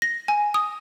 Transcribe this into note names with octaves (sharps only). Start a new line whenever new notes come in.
A#6
G#5
D#6